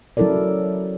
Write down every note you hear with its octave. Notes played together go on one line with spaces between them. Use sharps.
F#3 C#4 E4 A4 A#4 D5